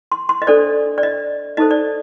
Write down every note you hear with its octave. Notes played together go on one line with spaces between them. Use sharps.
C6
C6
D#5
D4 A4 C5 D5
D5
D#5
D#4 A4 C5 D#5
D5